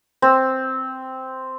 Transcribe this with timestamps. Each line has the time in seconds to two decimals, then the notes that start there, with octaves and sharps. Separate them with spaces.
0.22 C4